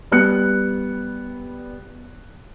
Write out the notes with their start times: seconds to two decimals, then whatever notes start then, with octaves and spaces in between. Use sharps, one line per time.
0.12 G3 B3 F#6 C#7